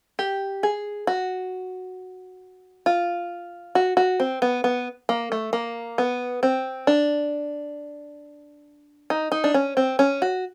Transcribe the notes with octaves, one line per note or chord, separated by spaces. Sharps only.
G4
G#4
F#4
F4
F#4
F#4
C4
B3
B3
A#3
A3
A#3
B3
C4
D4
D#4
D#4
D4
C#4
C4
C#4
F#4